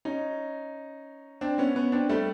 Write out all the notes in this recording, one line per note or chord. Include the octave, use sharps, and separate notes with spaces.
C#4 D#4
C4 D4
B3 C#4
B3 C#4
C4 D4
G3 A3